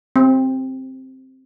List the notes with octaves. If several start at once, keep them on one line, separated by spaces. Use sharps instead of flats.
C4